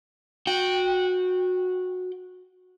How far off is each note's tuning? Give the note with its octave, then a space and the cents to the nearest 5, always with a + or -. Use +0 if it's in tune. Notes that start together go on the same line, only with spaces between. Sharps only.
F#4 -15 G5 +0